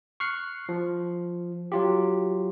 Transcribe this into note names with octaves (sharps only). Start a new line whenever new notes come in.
C#6 F6 F#6 C7
F3
F#3 F4 G4